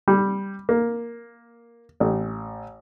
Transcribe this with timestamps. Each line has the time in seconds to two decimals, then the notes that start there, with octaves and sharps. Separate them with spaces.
0.08 G3
0.69 A#3
2.00 A1